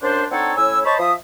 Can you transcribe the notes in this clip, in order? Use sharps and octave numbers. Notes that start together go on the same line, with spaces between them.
F#2 D4 C5
C4 D4 D#4 A4 C#5 F#5
A2 C#4 E4 G#5 E6
C5 C#5 D#5 A5 B5 C#6
F3 C5 E5 D#6